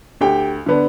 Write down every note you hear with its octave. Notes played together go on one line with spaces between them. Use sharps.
D2 G4 G5
D3 B3 D4